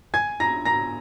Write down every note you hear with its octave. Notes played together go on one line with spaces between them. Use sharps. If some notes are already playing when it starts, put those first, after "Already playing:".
G#5 G#6
A#5 A#6
A#5 A#6